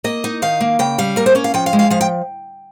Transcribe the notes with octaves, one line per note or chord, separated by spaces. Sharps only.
A#3 D#5
D#4
D#3 F5
A#3
C#3 G5
G3 F5
A#3 A#4
C5
C#4 C#5
F5
F3 G5
F5
G#3
F5
F3 F5
G5